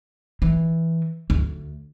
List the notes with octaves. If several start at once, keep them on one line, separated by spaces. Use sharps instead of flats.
E3
D2